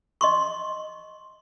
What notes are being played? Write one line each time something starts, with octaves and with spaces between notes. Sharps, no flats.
D#5 C6 C#6